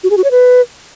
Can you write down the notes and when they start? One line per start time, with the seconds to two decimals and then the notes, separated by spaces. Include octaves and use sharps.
0.04 F#4
0.10 G#4
0.17 F#4
0.24 C#5
0.31 B4